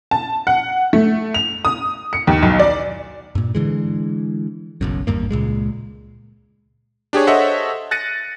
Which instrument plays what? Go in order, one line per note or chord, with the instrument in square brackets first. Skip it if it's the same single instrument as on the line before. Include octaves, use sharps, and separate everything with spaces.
[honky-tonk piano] A5
F#5
A3
F7
D#6
C#7
D#2
B1
D5
[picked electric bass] G2 A#2
D3 E3 G#3
F#1 B1 F#2
G#1 E2 G2 A#3
C#2 A#2 G#3
[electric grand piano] D4 G4 G#4 C#5
A4 C5 C#5 D#5 E5 F#5
F#6 A6 A#6 C#7 D#7